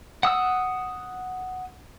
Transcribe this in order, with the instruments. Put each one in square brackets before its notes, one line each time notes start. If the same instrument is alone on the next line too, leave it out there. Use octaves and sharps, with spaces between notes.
[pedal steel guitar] F#5 D#6 E6